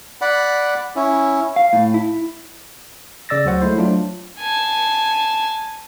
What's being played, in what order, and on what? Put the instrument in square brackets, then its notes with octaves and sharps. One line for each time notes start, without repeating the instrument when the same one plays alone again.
[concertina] D5 F#5 B5
C#4 E4
[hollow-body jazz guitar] F5
A2
E4
[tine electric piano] C#3 D5 E6 A6 A#6
D2 F#3 F#4 C5 F#5
G#3 A3 E4 C5
F#3 A3 D4 F4
[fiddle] G#5 A5